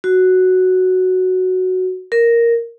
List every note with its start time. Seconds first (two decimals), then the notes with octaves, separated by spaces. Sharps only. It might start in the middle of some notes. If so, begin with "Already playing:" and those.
0.04 F#4
2.12 A#4